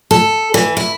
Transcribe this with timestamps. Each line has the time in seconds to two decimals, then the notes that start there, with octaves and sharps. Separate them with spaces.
0.11 A4
0.54 E3
0.77 E4